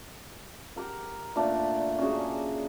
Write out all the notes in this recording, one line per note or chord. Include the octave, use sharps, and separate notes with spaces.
G4 A#4 F#5
A#2 A3 D4
C#4 F#4 G#4